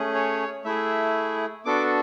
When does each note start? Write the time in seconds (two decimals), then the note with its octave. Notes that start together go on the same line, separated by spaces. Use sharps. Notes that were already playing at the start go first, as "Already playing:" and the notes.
Already playing: A3 C#4 G#4
0.14 C#5
0.65 A3 E4 G#4 E5
1.65 B3 D4 F#4 A4 D6